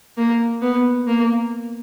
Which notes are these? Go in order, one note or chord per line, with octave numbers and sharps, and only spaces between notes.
A#3
B3
A#3